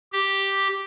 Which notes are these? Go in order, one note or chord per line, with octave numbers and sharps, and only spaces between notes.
G4